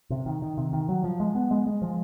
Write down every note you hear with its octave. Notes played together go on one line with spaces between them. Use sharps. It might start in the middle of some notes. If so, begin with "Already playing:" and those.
C3
D#3
D#3
C3
D#3
F#3
F3
G#3
B3
G#3
G#3
F3